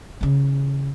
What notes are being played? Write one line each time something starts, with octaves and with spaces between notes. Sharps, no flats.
C#3 E3